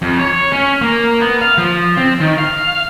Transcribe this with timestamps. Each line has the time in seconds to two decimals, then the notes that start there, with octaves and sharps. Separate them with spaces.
0.02 F2
0.20 C#5
0.52 C#4
0.82 A#3
1.21 B3
1.41 F5
1.58 F3
1.97 C4
2.20 D#3
2.38 F5